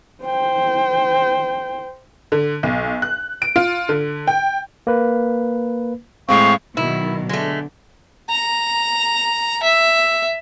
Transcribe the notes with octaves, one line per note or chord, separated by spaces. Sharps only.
C5 G5
D3
B1
F#6
D7
F4
D3
G5
A#3 B4
A2 G#3 C4 F5 C#6
B2 D#3 F#3 E4
D3 G#3 A3
A#5
E5